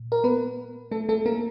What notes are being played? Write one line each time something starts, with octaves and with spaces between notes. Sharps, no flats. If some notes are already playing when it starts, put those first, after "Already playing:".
Already playing: A#2
A#4
B3 B4
A3 A4
A3 A4
A#3 A#4